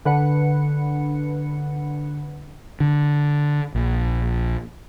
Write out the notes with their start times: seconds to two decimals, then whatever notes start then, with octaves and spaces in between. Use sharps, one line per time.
0.05 D3 B4 F#5 C#7
2.80 D3
3.75 A#1